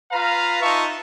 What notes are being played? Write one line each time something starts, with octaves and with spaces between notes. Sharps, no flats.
F4 B4 F5 A#5
D#4 F4 E5 A5 C#6